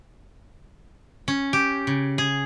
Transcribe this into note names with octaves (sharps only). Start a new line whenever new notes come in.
C#4
G4
C#3
G#4